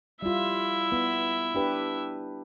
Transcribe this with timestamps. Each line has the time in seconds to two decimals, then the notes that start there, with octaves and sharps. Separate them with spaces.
0.22 G3 E4 F4 E5
0.92 B3
1.55 D4 G4 B4